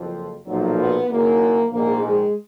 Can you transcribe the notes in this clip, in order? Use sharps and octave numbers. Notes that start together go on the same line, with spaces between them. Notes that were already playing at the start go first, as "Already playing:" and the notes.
Already playing: F#1 F2 F3
B1 A#2 F3 F#3
B3
F#1 F#2 D#3 A#3
A#1 G#2 D#3 A#3
G#3